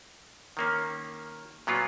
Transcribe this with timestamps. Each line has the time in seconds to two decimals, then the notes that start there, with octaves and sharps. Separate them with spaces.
0.57 D#3 A#3 C#4
1.67 A#2 F#3 B3 F4